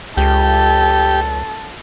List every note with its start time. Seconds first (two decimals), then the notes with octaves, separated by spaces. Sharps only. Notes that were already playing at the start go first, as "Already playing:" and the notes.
0.17 C#2 G4 A4